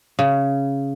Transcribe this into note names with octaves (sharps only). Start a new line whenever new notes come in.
C#3